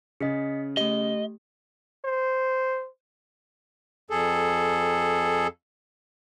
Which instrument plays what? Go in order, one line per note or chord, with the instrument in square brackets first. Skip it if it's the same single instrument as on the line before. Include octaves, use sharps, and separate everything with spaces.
[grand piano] C#3 [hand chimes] D#5 B6 C#7
[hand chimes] A3 G4 [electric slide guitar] D#5
[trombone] C5
[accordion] F2 G#4 A4